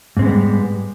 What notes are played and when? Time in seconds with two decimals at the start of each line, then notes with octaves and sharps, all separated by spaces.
0.17 G#2
0.19 C4
0.22 G#3
0.24 B3
0.27 G3